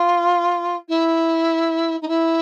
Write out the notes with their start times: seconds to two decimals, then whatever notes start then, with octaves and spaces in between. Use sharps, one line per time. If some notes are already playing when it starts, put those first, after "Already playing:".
Already playing: F4
0.88 E4
2.01 D#4
2.08 E4